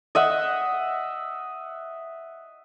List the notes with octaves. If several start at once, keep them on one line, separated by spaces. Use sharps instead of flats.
D#5 E5 F#5